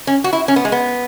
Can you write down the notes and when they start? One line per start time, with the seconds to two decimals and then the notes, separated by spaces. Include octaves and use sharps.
0.07 C#4
0.24 F#4
0.33 E4
0.48 C#4
0.56 B3
0.65 G#3
0.72 B3